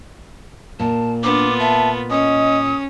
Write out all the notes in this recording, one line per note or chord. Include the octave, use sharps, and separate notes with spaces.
A#2 A5
B3 D4 F4 D6
E5 A5
C#4 D#5 D#6